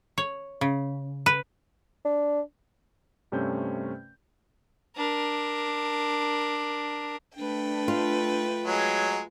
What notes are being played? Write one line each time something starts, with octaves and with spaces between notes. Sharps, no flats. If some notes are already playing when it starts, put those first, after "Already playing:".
C#5
C#3
B4
D4
G2 C3 A3 C#4 C5 G6
D4 A#4
A3 D4 B4 G5
F4
F#3 G#3 C#5